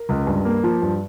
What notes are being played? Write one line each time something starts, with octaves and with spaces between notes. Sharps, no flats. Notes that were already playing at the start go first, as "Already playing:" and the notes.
Already playing: A#4
C#2
G2
A#3
F3
G2